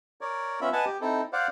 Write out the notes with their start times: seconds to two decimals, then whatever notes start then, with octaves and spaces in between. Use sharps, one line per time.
0.21 A#4 C#5 D5
0.61 B3 C#4 F4 E5 B5
0.73 B4 D#5 F#5 G#5 A5
0.85 G4
1.01 C4 D#4 E4 A4
1.33 C5 D5 F5 F#5